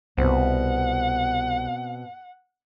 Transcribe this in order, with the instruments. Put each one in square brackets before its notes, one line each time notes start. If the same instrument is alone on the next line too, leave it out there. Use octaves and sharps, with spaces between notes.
[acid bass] C2 [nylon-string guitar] B2 C4 [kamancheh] F#5